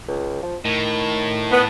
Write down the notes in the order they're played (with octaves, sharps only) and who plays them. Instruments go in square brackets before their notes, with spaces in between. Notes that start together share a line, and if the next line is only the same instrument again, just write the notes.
[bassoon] C#2
F3
[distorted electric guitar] A2 [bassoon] D#3
[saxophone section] B3